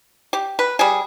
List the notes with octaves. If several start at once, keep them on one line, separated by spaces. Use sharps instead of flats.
G4
B4
G3 G#4